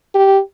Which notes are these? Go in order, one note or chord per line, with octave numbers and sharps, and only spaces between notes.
G4